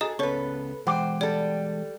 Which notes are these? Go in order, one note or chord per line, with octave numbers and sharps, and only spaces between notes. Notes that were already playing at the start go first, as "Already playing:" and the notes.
F#4 G#4 A4 D#5 A#5 D#6
C#2 B3 C#4 A4 B4 C#5 C#6
E3 G#3 C5 F#5 G5 D6
G3 A4 D5